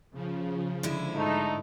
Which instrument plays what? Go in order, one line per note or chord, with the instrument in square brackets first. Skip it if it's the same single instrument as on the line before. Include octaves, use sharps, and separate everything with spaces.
[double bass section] C#3 [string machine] F3
[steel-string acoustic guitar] D3 G#3 E4
[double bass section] G#2 [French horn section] A3 D#4